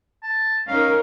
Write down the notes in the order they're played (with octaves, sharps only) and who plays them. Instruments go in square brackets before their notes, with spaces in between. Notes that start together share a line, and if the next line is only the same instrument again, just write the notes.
[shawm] A5
[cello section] C#4 D#4 A#4 [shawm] F5